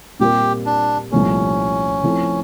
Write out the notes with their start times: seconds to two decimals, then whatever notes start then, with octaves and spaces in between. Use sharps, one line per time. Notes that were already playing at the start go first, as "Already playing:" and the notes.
0.20 A#2 G3 C4 F4 G4 A#4
0.66 D4
1.12 C2 A#2 F3 A3 C#4
2.04 F3 A3 C4 E4 A4